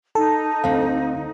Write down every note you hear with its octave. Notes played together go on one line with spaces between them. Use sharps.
D#4 A4
D2 C4 F5